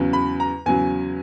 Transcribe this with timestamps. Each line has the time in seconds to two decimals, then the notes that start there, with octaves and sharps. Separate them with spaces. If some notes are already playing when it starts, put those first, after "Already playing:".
Already playing: E2 C#3 F#3
0.13 B5
0.40 A#5
0.66 E2 C#3 F#3 G#5